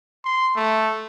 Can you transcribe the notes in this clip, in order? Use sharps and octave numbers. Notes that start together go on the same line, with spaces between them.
C6
A3